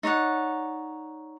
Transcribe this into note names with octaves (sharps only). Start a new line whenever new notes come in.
D#4 C#5 D5 F#5